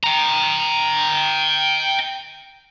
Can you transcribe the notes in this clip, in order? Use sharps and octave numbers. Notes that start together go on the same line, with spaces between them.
G5 A#5